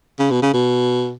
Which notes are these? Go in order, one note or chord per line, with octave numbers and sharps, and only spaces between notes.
C#3
B2
C#3
B2